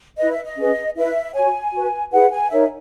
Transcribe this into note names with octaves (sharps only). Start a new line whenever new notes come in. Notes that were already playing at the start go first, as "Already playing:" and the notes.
E4 B4 D#5
E5
D#5
C#4 G#4 B4
E4 B4 E5
F#4 C#5 G#5
F#4 B4
E4 G#4 B4 F#5
G#5
D#4 A#4 C#5 E5